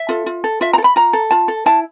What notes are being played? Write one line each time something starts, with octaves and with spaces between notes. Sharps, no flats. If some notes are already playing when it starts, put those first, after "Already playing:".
Already playing: E5
F4 A4
F4
A4
F4 E5
A#5
A4
B5
F4 A#5
A4
F4 A5
A4
E4 A5